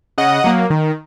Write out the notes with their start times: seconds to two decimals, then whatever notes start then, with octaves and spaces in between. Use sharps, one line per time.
0.18 C#3 D#5 F#5
0.44 F#3 A#3
0.70 D#3